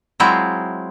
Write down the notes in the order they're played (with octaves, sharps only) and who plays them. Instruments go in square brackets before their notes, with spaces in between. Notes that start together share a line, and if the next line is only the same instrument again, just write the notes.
[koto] F#3 G#3 C4 E4 F4